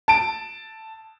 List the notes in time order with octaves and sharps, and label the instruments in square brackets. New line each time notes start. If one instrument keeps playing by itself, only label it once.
[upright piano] A5 D7